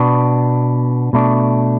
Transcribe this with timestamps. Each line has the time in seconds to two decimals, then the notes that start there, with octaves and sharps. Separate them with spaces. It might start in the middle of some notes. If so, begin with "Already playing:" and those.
Already playing: B2 B3 D4
1.13 B2 A3 D4